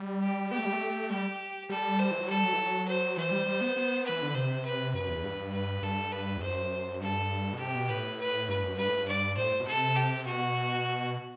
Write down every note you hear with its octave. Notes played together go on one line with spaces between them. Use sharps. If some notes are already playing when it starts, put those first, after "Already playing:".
Already playing: G3
G4
B3 G4
A3
G3
A3
G3 G4
G3 A4
C5
E3
F#3
G3 A4
F#3
E3
F#3
C5
E3 C5
G3
G3
B3
B3
E3 B4
D3
C3 C5
B4
F#2 B4
E2
G2
B4
G2 A4
B4
E2
F#2 C5
G2 A4
B2
C3 G4
B2
A2 B4
B4
G2 B4
F#2
G2 B4
A2
G2
D5
A2 C5
B2
C3 A4
G4
B2 F#4